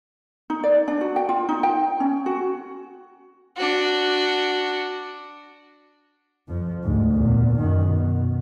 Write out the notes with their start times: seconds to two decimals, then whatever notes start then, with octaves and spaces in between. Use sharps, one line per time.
0.50 D#4
0.63 D5
0.88 D4
1.01 F#4
1.16 G5
1.29 F4
1.49 D#4
1.63 G5
2.00 C#4
2.26 F#4
3.57 D4 F#4
6.48 F2 F3
6.83 D2 G#2
7.12 E2 A#2
7.56 F#2 D#3
7.86 B2